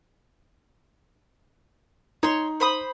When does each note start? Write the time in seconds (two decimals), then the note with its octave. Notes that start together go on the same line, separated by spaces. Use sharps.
2.23 D#4 C#5 C6
2.60 C5 B5 D#6